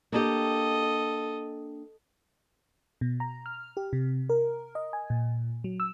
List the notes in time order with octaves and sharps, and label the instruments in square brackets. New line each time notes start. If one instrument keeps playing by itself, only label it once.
[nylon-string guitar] A#3 D4 G4 [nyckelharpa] A4 D#5
[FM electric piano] B2
A#5
F6
G4
C3
A#4
D#5
G#5
A#2
F#3
E6